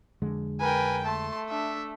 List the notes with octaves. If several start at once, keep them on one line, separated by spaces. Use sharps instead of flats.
F2 D3 G#3
A#4 B4 G5 G#5
A3 A5 C6
D4 E5